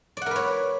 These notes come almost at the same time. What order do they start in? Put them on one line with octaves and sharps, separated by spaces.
D5 F#5 A#4 B4 C#5